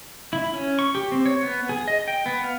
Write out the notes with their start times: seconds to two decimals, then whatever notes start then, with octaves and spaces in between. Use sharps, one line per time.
0.33 E4
0.54 C#4
0.79 C#6
0.95 G4
1.12 C4
1.26 C#5
1.43 B3
1.69 G#4
1.88 D#5
2.08 G5
2.26 B3
2.44 F5